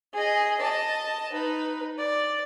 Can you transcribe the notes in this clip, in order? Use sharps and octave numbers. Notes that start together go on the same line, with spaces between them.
G#4 D#5
D#5 A5
D#4 B4
D5